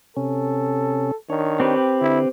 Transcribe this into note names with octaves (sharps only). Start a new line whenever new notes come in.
C3 C#4 A4
D#3 D4 C#5
C4 G4 B4
D3 E4